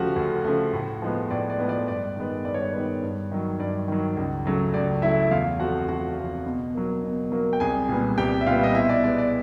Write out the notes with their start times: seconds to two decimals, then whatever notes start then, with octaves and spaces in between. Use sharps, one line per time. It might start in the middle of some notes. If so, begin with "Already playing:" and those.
Already playing: D2 C#3 F3 A3 F#4 G4 F#5
0.16 D2
0.44 C#3 F3 A3
0.73 A2
1.02 F3 G#3 B3
1.30 A2 D5
1.50 D5
1.59 F3 G#3 B3
1.69 D5
1.87 G2 D5
2.16 D#3 G#3 B3
2.45 G2 D5
2.54 C#5
2.74 D#3 G#3 B3 C#5
3.02 G2
3.31 D#3 F#3
3.59 G2 D5
3.88 D#3 F#3
4.17 C#2
4.46 C#3 F#3 A3
4.74 C#2 D5
5.02 C#3 F#3 A3 E4 E5
5.31 E2 F4 F5
5.60 C3 F3 A3 F#4 F#5
5.88 E2 F#4 F#5
6.18 C3 F3 A3
6.46 B2
6.75 F#3 A#3
7.03 B2
7.32 F#3 A#3
7.53 G5
7.60 C2 G#4 G#5
7.89 A#2 G3 B3
8.18 C2 G4 G5
8.41 E5
8.46 A#2 G3 B3 F4 F5
8.63 D#5
8.75 B2 E4 E5
8.89 D5
9.04 G#3 B3 D5
9.18 D5